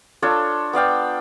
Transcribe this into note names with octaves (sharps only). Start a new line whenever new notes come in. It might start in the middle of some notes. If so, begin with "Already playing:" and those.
D4 F4 A4 C#5
B3 D5 F5 G5